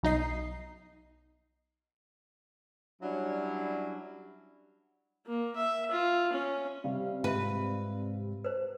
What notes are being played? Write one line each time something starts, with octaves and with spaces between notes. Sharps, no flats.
B1 D#4 D#5 C7
F#3 G3 C#4 D4 E4
A#3
E5
F4
C#4
C3 G3 F5
G#2 F4 B4 E5
B4 C5